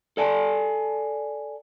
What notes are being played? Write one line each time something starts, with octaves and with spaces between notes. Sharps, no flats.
A4 D5 G#5 A5